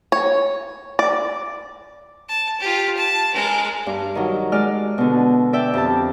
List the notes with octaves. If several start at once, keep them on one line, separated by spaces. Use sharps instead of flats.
C#5
D5
A5
F4 G4
A5
G#3 A#4
G2
D#3 F#3
G#3 D5 F6
B2 D3
D5 E5 G5
F2 G4 A5